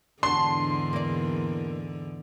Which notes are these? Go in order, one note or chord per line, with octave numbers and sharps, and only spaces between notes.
E2 G#2 D3 D4 F#4 C6
A#3 D5